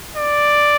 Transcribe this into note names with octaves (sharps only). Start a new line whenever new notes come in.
D5